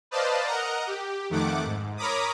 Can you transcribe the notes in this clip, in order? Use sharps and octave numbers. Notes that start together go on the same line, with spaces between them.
B4 C5 D5 D#5 F5 A5
A#4 D#5 F#5 A#5
G4
F2 D#3 A3 F#5 D6
G#2
A#4 C#5 A#5 B5 D6 D#6